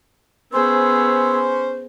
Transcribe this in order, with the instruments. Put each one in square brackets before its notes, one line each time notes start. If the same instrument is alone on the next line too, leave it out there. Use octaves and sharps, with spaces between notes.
[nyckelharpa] B3 G#4 [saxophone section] C#4 C5 [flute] E6